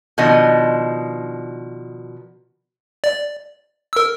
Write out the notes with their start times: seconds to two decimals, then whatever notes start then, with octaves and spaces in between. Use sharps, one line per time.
0.18 B2 D#3 F3 D4 D#5
3.04 D5
3.93 A#4 E6